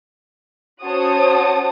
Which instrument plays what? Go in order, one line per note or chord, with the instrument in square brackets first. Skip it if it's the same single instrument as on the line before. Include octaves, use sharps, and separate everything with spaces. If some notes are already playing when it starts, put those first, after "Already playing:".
[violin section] C#4 F#4 C5 C#5 A5 D#6